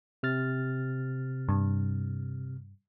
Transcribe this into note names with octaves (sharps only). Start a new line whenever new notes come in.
C3 F6 A6
G2